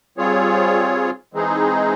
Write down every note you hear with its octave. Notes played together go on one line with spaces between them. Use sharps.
G3 C4 F4 G#4 C#5
E3 G#3 C4 D#4 G#4